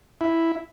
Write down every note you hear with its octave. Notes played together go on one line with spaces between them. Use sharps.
E4